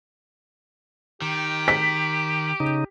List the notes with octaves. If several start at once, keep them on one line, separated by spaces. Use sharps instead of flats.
D#3 G4
B6
C#3 D#4